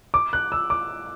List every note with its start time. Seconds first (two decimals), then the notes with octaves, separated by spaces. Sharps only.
0.14 D6
0.33 F#6
0.52 E6
0.70 D6